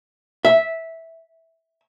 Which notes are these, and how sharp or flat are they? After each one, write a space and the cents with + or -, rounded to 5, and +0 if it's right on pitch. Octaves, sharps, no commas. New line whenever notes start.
E5 -10